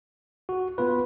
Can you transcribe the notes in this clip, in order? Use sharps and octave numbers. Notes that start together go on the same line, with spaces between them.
F#4
B3 F4 B4